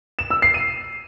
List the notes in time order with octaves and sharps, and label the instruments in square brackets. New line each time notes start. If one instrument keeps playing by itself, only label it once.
[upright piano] E7
E6
C7
D#7